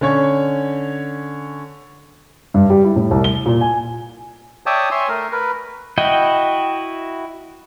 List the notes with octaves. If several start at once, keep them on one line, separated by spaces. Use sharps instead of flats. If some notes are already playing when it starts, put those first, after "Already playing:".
D3 C#4 C#5
G2
G3
E4
A2
C2
G7
A#2
G#5
C#5 D5 E5 G5 A5 D#6
C#5 E5 G#5 C6
A3 A#4
A#4 B4
E4 F#4 D#5 G5